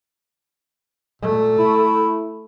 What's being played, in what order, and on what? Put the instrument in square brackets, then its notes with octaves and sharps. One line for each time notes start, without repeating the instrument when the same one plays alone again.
[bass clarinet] A#2 [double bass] A3
[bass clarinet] E4